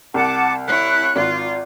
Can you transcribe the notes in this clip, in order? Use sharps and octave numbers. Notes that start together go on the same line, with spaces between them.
C2 F#5 A5 D6
E4 C#5 F#6
G#1 F4